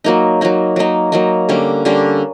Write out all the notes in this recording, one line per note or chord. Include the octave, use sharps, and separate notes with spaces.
F#3 A#3 D#4
F#3 A#3 D#4
F#3 A#3 D#4
F#3 A#3 D#4
D3 G3 A#3 C#4
D3 G3 A#3 C#4